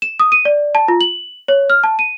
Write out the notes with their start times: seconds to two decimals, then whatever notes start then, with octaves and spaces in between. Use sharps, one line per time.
0.02 E7
0.20 D#6
0.32 D#7
0.45 D5
0.75 A5
0.88 F4
1.01 F#7
1.48 C#5
1.70 F6
1.84 A5
1.99 D#7